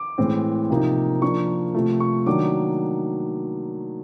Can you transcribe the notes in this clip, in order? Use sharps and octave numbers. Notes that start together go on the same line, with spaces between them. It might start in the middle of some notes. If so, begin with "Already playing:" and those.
Already playing: D6
A2 E3 G#3 C4 E4
C3 F3 A#3 D#4
F3 A#3 D4 C#6
C3 F3 A3
C#6
D#3 F#3 A#3 D4 D6